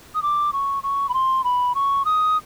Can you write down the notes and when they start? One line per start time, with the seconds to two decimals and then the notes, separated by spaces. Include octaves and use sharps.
0.15 D#6
0.23 D6
0.53 C#6
0.83 C#6
1.09 B5
1.14 C6
1.44 B5
1.75 C#6
2.05 D#6